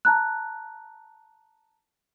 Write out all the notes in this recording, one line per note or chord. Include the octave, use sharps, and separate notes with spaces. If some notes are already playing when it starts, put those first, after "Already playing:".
A5 A#5 F#6